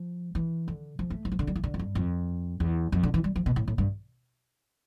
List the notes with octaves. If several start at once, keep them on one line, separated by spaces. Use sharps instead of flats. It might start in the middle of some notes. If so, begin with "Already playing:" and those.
Already playing: F3
E3
D3
F3
A3
E3
F3
D3
G3
E3
D3
F2
G2
F2
E2
F2
D3
E3
G3
F3
B2
A2
A2
G2